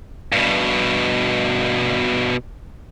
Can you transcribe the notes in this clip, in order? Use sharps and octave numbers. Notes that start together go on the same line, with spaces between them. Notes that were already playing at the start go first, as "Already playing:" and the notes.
G2 B2